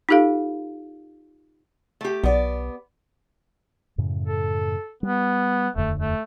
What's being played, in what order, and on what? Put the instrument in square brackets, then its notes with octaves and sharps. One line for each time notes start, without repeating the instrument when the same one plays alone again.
[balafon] D#4 F4 G4 A4 F5
[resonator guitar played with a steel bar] A3 G4
[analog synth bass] B1 [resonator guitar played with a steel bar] B3 D5
[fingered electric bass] F#2 A2 C#3
[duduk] A4
[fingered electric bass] G3 [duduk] B3
[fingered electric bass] D#1 F2 D3 [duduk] A3
[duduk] A3